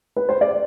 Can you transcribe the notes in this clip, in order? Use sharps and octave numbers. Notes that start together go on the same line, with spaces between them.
B4
C5
D5